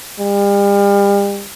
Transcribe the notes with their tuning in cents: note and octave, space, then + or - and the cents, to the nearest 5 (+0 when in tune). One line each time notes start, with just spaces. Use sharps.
G3 +40